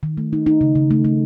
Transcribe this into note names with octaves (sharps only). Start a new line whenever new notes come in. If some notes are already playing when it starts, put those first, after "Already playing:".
D#3
A3
D#4
D#4
C#3
C#3
A3
A3